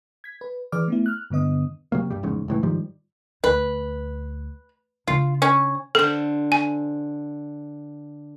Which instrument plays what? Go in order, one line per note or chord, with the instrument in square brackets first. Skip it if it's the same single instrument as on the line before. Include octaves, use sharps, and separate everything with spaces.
[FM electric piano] G#6 B6
B4
E3 G#4 B4 D5 D6 F6
A3 B3 E4
F6 F#6
G2 D3 B3 D#5 D#6
[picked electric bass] C3 F#3 A#3
G2 G3
F1 E2 G#2 C#3
C#2 A2 E3
G#2 D#3 F3 G3
[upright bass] D2 [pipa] B4
[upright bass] C#3 D4 [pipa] F4
[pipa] C#4
[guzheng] D3 C5 [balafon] A4
[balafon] G#5